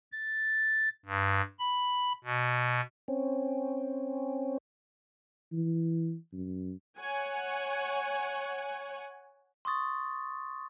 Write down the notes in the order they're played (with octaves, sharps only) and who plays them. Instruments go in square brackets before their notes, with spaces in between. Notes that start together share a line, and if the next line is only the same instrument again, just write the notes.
[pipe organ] A6
G2
B5
B2
[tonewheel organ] C4 C#4
[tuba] E3
F#2
[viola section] C#5 F#5 G#5
[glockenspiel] C6 C#6 D#6 A6